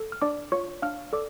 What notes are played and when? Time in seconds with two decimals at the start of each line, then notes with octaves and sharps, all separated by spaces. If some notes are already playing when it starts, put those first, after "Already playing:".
Already playing: A4
0.12 F6
0.22 D4 D5 D6
0.52 F4 C#5 C#6
0.82 D4 F5 F6
1.13 A4 D5 D6